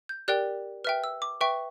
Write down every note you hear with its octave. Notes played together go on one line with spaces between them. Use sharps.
G6
G4 A#4 D5 G5 F#6
B4 E5 G5 F6
E6
D6
B4 E5 G5 C#6